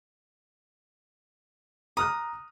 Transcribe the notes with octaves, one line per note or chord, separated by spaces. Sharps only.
A#5 D#6 F6 F#6